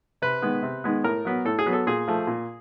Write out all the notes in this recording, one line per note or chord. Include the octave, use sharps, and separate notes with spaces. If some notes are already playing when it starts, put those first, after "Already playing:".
C3 B4
D#3 G#3 B3
C3
D#3 G#3 B3
A2 A#4
F#3 B3
A2 A4
G#4
F#3 B3
A4
A#2 G#4
F3 A3
A#2